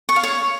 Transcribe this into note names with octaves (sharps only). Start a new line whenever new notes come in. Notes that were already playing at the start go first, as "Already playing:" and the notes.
C#6
F5
C#5